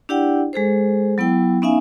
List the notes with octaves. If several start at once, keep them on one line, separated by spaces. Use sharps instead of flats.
D4 E4 G4 D5 F#5 G5
G#3 G#4 A4 C5
F#3 B3 E4 G5
B3 C#4 D#4 E5 F5 G#5